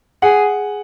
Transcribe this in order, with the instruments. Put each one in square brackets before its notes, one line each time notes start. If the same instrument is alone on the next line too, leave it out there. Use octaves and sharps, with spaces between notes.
[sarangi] G#4 [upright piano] F#5